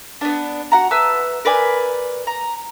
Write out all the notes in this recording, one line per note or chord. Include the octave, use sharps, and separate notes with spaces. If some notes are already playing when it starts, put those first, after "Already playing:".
B3 D4
F#4 F#5 A#5
B4 E5 A5 E6
A#4 B4 D5 G#5
A#5